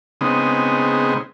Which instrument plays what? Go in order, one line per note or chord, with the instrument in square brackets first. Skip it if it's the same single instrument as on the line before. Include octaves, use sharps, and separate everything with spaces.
[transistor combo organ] C#3 G#3 B3 C4 D#4